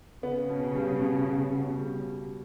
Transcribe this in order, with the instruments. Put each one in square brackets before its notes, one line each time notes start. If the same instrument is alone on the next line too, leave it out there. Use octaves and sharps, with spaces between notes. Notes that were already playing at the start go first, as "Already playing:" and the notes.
[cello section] C#3 [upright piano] B3
[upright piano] B2
G3
B2
B2
B2
G3